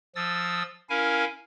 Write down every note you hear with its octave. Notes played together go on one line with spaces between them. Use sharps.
F3 D#6 E6 A6
C#4 E4 A#4 F5 G#5